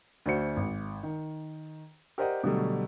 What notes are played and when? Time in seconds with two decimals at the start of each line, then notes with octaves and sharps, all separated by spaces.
0.26 D2 D4 F#4 C5 C#7
0.57 G#1
1.03 D#3
2.18 G4 A#4 C5 D5 D#5 F#5
2.44 B2 D3 F#3 G3 A3